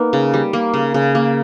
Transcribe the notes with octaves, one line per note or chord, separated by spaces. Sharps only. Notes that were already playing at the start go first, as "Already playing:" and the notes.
Already playing: A#3 B3 D#4
C#3
G3
A#3
C#3
C#3
A#3